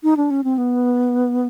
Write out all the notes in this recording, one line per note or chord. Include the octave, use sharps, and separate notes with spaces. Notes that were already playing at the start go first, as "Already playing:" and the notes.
D#4
D4
C#4
C4
B3